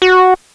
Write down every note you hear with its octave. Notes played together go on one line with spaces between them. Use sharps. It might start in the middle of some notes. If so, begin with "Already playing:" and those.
F#4